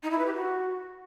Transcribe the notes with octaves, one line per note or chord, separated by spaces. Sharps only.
D#4
E4
B4
G4
F#4